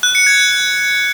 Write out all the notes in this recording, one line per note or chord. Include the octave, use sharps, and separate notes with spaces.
F#6
C#7
G#6